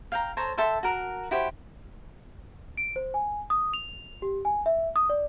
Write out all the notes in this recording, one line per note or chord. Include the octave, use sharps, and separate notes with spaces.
F5 G5 A#5
A4 C5 C#5 A#5
A4 E5 G5 C6
F#4 A#4 A#5
E4 F#4 G4 C5
D7
C5
G#5
D#6
F7
G4
G#5
E5
D#6
D5